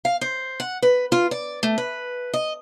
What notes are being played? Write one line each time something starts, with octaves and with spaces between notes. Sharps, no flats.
F5
C5
F#5
B4
F4
D5
A3
B4
D#5